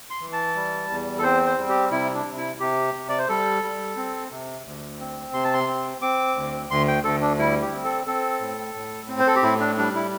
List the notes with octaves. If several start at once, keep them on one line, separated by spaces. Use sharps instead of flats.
C6
E3
A5
G3
E2
A4
C4 C5
C5
G3
G4
C3 E4
D4
C3
E4
C3 G4
C3
D5
C5
G3 A4
G3
C4
C3
D2
C4
C3 C6
A5
C6
C4
C4 D6
D2
D2 C6
G5
D2 A4
D4
G3 E4
G4
C4
A4
C4 A4
A2
A2
C4
C5
A4
G4
A2 E4
D4
G3 D4
E4